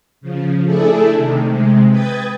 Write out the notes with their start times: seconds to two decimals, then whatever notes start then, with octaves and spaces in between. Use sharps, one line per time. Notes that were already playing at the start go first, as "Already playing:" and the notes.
0.21 C#3 F3
0.64 A3 D4 E4 G#4 A4
1.14 C3 D#3
1.46 C3 G#3
1.90 B4 G5 D#6 G#6 A6